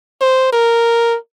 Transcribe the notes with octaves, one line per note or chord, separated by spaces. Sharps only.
C5
A#4